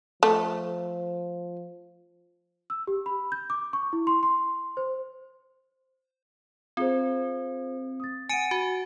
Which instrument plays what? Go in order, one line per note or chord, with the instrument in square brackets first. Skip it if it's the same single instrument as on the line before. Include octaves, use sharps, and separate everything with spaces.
[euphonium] F3 [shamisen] A3
[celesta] E6
G4
B5
G6
D6
C#6
E4
C6
C6
C5
[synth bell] C4 [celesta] F4 G#4 C5
[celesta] D#6 A6
[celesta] F#5 A6 [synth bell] G#5 D7 D#7
[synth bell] F#4